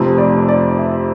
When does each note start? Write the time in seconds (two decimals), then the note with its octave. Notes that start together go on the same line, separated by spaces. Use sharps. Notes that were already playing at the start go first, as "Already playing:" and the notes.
Already playing: F1 F2 C3
0.18 D5
0.48 D5
0.79 E5